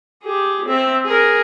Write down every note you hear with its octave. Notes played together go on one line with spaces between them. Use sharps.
G4 G#4
C4 E5
G#4 A#4